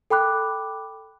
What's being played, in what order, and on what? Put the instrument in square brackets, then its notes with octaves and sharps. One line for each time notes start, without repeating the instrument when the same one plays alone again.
[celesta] A4 G5 B5 D6 F#6